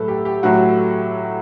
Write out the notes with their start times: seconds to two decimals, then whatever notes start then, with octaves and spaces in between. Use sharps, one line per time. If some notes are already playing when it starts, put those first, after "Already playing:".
Already playing: A2 F#3 A4 B4
0.08 G4
0.25 G4
0.43 A2 F#3 F#4